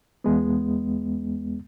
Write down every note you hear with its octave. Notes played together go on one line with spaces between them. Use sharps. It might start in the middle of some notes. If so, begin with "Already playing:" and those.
E2 G#3 B3